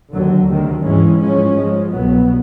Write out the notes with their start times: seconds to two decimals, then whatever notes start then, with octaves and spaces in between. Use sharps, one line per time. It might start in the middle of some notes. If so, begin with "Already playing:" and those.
0.13 D#2 D3 F#3
0.49 D2 C3 D#3
0.84 G#2 E3 G#3 C#4
1.21 G#2 F3 G#3 C#4
1.57 G#2 F3 G#3
1.93 C2 B2 F#3 B3